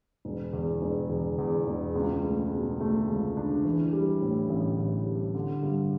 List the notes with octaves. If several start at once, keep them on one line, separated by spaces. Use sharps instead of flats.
E1
E2
E1
E2
E2
E1
C#2
A3
B2
A3
C#2
D4
E3
G3
A2
A1
A1
G3
D3
G2